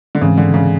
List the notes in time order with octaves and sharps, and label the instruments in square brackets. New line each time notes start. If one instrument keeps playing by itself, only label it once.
[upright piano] D3
[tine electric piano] G#2 E3 G#3 C4 [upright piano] C#3
[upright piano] D3
C#3